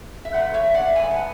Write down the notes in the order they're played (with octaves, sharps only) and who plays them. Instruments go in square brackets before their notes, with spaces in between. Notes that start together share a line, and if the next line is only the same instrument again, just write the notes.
[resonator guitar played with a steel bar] E5
G#2 E3 A3 F#5
C#5 E5
D5 F#5
G#2 E3 G#3 B3 E5 G#5
F#5 A5